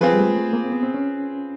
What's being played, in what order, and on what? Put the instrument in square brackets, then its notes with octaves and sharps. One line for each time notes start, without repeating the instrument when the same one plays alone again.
[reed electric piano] F3 [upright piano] C4 F4 G#4 B4
[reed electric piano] G3
A3
G#3
A3
A#3
C4
B3
C4
C#4